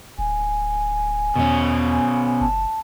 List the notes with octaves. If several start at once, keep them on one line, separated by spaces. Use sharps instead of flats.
D1 G#5
E2 B2 C#4
F#1 A5